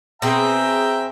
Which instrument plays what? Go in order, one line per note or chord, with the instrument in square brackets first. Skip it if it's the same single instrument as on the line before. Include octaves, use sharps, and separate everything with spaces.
[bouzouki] B2 C4 G#4 [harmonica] E5 G5 A#5